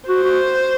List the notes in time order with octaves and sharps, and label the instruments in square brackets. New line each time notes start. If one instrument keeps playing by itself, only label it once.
[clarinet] F#4 [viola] C5
[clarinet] F#4